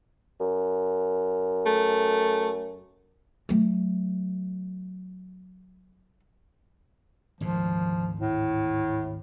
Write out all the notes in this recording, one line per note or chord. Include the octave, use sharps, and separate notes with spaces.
F#2
A3
F#3 A3
G#1 D2 A#2 F3
A2